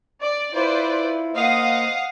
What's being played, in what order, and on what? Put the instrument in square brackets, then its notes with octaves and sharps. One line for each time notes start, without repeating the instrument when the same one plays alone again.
[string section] D5
[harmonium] E4 F4 [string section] B4 C5 D5
[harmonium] A#3 C5 D#5 [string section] F5 F#5 D#6